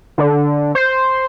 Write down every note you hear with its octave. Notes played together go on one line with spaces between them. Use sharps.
D3
C5